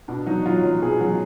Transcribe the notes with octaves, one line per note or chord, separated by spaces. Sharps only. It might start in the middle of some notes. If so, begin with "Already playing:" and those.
B2 D4
F#3 D#4
F#3 F4
F#3
B2 G#4
F#3